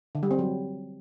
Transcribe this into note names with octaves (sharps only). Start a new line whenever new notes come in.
D3
G3
C4
F#3